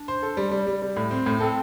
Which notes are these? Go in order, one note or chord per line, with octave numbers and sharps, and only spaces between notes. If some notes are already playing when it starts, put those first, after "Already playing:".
Already playing: D4
C5
A4
G3
G3
G3
G3
A2
C4
A2
C4 A4